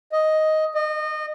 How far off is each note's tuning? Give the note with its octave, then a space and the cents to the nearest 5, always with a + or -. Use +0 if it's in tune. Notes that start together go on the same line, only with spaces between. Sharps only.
D#5 +5
D#5 -30